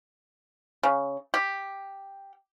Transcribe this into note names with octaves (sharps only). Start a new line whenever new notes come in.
C#3
G4